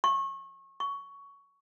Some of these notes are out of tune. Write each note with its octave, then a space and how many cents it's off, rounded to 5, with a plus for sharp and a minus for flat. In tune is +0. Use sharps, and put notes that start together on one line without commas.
C#6 -30
C#6 +15